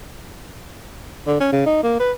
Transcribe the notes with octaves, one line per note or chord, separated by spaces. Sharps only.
D3
C#4
C#3
D#4
A#3
B4